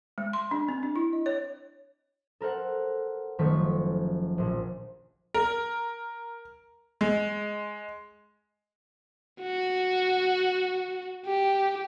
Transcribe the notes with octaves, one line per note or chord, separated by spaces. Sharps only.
G#3
C6
D4
C4
D4
E4
D#5
C#5
A4 A#4 C5 F#5
F#1 D#3 F3 A3 C#6 B6
A#1 A#2
A#4
G#3
F#4
G4